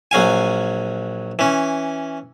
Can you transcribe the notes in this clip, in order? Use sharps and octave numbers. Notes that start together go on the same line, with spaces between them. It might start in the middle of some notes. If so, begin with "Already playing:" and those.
A#1 F#3 F5 G#5
E3 C#4